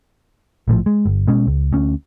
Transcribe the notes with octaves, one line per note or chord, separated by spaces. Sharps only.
A#1 A2 D3 F3
G#3
G1
B2 G#3 C#4
C#2
D2 C#4